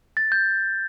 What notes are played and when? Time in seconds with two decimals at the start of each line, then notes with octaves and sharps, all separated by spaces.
0.17 A6
0.32 G6